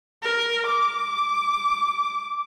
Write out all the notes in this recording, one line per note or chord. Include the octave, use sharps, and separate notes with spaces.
A#4
D6